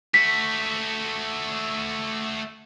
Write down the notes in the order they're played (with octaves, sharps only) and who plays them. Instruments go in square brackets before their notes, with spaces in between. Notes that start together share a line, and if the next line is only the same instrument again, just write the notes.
[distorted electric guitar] A3 F#4 [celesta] B6